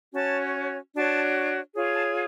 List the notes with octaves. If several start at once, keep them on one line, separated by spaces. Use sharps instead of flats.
C#4 F#4 C#5 A5
D4 F#4 C#5 A5
F4 G#4 C#5
A5